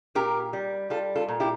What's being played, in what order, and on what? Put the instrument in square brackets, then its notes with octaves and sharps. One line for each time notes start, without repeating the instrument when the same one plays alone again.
[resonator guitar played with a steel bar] A#2 G4 A#4
G3
G3 F4 A4
F4 A4
A#2
E4 G4